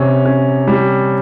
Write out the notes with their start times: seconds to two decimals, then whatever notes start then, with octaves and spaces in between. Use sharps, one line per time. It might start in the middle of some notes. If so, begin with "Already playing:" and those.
Already playing: C3 C#4
0.25 C#4
0.67 G3